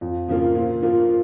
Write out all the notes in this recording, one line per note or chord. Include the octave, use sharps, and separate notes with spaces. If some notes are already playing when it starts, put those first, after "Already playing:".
F2
C#3 F3 A#3 F4
A#2
F3 A#3 F4